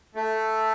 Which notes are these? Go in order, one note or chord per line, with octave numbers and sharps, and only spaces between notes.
A3